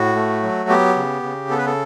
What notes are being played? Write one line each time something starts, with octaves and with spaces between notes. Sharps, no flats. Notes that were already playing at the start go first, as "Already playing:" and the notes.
Already playing: A2 F#4
A3
F#3
B3 G4
C#3
C#3
B3 A4
B4
A4